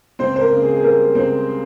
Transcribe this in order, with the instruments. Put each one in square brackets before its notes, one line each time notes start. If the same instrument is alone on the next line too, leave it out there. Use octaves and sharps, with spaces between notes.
[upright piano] C#2 C4 C5
C5
A#3 A#4
C#3
G#4
G#4
G3 A#3 A#4
C#2 C4 C5